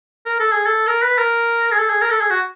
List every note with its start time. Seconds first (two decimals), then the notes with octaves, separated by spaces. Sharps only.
0.26 A#4
0.40 A4
0.52 G#4
0.66 A4
0.87 A#4
1.03 B4
1.18 A#4
1.71 G#4
1.79 A4
1.89 G#4
2.01 A#4
2.10 A4
2.21 G#4
2.30 F#4